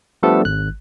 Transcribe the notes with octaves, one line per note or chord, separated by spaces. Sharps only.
F3 G3 A3 B3 D4 A4
G#1 F#6